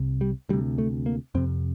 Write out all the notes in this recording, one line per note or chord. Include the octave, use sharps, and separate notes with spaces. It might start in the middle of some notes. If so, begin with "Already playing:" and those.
Already playing: C2 C3
G3
D2 C3 G3
A3
A#3
F2 C3 C4